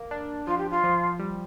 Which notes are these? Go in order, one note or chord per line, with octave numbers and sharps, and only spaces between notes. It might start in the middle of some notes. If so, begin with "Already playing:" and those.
Already playing: A#3
D4
F3 F4
G4
F4
F3
G3